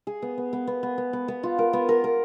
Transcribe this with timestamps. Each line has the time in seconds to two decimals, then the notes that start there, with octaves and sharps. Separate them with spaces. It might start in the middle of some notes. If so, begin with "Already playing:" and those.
0.07 G#4
0.22 B3
0.38 B3
0.53 B3
0.67 B3
0.83 B3
0.98 B3
1.13 B3
1.28 B3
1.43 F4
1.58 A#4
1.73 B3
1.89 A#4
2.04 A#4